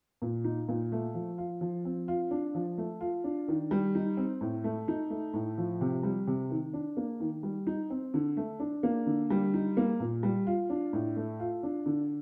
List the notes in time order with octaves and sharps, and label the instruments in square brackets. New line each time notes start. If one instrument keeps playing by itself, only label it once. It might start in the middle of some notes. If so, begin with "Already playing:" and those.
[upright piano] A#2
D#4
A#2
A3
F3
F4
F3
C4
F4
D4
F3
A3
F4
D4
D#3
G3
D#4
C4
A2
A3
D#4
A3
A2
F3
C3
G3
C3
D#3
D4
A#3
D#3
G3
D#4
C4
D3
A3
D4
A#3
D3
G3
D#4
A#3
A#2
G3
F4
D4
A2
A3
F4
D4
D3